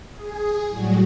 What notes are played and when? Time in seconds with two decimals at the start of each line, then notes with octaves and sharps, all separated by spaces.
0.13 G#4
0.69 A2 F#3 G3 F#4